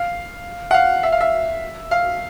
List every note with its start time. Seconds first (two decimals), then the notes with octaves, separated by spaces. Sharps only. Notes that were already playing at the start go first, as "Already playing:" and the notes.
Already playing: F5
0.71 F#5
0.74 F5
1.03 E5
1.12 F5
1.21 E5
1.91 F5